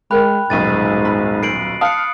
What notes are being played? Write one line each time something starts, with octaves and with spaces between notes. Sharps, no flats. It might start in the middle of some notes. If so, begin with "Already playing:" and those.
G#3 A#4 G5 B5 F#6
D#1 B1 G#2 A6 D#7
B5
C5 C7 D7 F#7
F5 A5 D#6 F#6 C#7